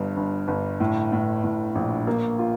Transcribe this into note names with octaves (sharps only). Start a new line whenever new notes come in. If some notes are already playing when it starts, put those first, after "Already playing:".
Already playing: G1 G2
G1
G1
A2
A2
A2
A#1
A#3
F4